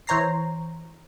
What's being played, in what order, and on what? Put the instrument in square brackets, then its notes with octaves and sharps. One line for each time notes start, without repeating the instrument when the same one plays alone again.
[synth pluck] E3 C5 C#5 A#5 A#6 C7